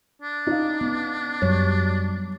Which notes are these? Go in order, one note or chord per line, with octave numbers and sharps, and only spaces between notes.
D4
C#4 D#4 F5
B3
F#2 F#3 G3 C#5